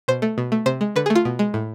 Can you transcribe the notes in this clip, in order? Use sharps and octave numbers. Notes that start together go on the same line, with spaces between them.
B2 C5
A3
B2
A3
C3 C5
G#3
D3 B4
G#4
A3
F4
B2
G#3
A2